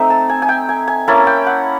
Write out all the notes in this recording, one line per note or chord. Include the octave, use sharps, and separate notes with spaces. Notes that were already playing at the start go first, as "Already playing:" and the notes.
Already playing: A3 C4 D#4 E5
A5
G#5
G#5
G5
G#5
G#5
A#3 C#4 E4 A5
G5
F#5